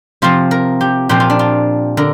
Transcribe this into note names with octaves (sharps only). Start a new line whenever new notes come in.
C3 F3 C4 F4
A#4
G4
A#2 F3 C4 G4
F4
D4
F4
D3 A#4